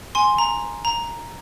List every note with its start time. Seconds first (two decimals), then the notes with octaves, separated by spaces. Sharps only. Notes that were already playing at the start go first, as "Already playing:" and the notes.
0.15 G#5 C6
0.38 A#5
0.85 A#5